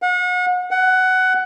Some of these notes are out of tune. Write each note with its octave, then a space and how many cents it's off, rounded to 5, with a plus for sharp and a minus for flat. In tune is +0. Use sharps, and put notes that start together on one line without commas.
F#5 -35
F#5 +15